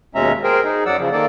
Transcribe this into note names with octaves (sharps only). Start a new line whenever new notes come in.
D#2 B2 G#3 C#4 E5 A#5
G#4 A#4 C5 G5
D#4 G#4
F#2 F#3 D5 F#5 E6
C#3 F3
D#3 A#3 A4 D5